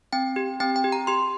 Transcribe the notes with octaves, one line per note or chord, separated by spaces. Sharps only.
C4 G5
G4
C4 G5
G5
G4
A#5
G4 C6